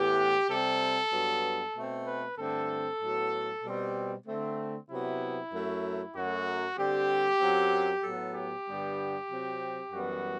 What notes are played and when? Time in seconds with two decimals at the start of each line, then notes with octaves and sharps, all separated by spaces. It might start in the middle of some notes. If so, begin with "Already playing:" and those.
Already playing: A2 E3 B3 G4
0.49 C3 G3 C4 A4
1.12 G2 F#3 B3
1.75 B2 A3 C4
2.06 B4
2.37 G2 D3 A3 C4 A4
3.01 A2 F#3 B3
3.63 B2 G3 C4
4.26 D3 A3 C4
4.89 C3 F#3 B3 E4
5.52 F#2 F#3 A3
6.14 F#2 F#3 A3 F#4
6.77 D3 G3 C4 G4
7.40 F#2 F#3 C4
8.03 A2 F#3 B3 A4
8.34 G4
8.66 G2 D3 G3 B3
9.29 C3 F#3 C4
9.91 F#2 E3 G3 B3 F#4